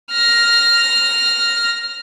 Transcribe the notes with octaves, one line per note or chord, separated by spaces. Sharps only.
F6 A#6